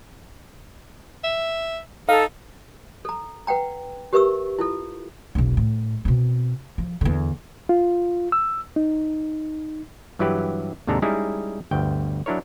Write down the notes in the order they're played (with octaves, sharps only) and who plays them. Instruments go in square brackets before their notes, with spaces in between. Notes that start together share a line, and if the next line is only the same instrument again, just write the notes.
[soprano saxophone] E5
[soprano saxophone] D#4 [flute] A4 [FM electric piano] F5
[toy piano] A4 A#5
B4 F#5 G5 A#5
G4 A#4 B4 E5 C#6 E6
E4 F4 A4
[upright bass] E1 B1
A2
B2 C4
F3
E2 D3
[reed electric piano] F4
E6
D#4
[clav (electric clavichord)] G2 E3 F#3 E4 G4 B4
D#2 G#2 C3 D4 A4 A#5
G3 G#3 C#4 D#4 E4 G#4
G1 D2 G5
F#3 D4 E4 A#4 C#5